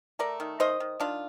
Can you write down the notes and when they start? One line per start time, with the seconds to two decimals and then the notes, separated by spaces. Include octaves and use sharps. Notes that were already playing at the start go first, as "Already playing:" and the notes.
0.19 A3 A#4 D5
0.40 D#3
0.60 D#3 C5 D#5
0.80 D#3
1.00 D#3 D4 F4